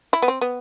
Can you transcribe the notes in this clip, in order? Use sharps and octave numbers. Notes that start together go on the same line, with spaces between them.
E4
B3
C4
B3